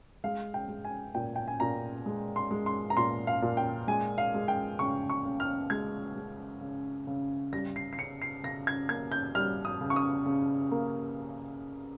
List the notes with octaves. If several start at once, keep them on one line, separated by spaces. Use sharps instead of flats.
G#3 F5
G5
G#3
G#5
A#2 G5
G5
G#5
A#2 A#5
G#3
C6
G#3
C6
A#5
A#2 C6
F5
A#2
G5
G#3 G#5
F5
G#3
G5
C#3 C#6
C#6
C#3
F6
G#3 G#6
G#3
C#3
C#3
G3 A#6
C7
C7
C#3 C#7
C7
C#3 A#6
G#6
A#3 G#6
G6
G3 F6
D#6
C#3
C#6
D#6
C#3
A#3